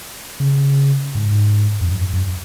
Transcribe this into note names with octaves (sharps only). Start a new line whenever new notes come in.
C#3
G#2
F2
F#2
F#2